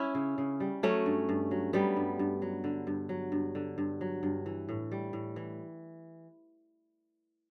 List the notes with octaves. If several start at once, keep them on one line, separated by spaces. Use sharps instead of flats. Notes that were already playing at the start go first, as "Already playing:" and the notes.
Already playing: C#4 E4
C#3
C#3
G3
F#3 A3 C#4
G2
G2
F#3
F#3 G3 B3
G2
G2
F#3
D3
G2
F#3
G2
D3
G2
F#3
G2
E3
A2
G3
A2
E3